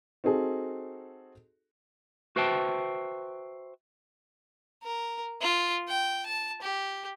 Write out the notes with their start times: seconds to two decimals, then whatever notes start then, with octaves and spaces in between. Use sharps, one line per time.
0.24 C4 D#4 F#4 G#4 A4
2.36 F#4 B4 C5 E5 G5 A5
4.83 A#4
5.42 F4
5.88 G5
6.26 A5
6.62 G4